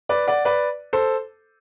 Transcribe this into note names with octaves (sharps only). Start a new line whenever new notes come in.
B4 D5
D5 F#5
B4 D5
A4 C5